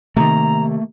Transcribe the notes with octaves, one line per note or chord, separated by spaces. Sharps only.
C3 D#3 A3 A#3 A#5